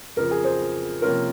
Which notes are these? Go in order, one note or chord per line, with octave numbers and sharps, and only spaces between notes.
F2 C#3 F3 A#4
G#4
C5
C3 F3 A#3 C#4 F4 A#4